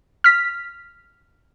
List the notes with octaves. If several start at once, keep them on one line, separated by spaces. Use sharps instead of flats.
F6 B6